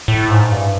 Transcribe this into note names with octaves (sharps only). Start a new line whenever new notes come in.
A2
G#2
G2